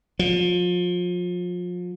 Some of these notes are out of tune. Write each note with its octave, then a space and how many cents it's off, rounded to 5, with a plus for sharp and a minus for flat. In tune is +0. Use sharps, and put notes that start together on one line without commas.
F3 +30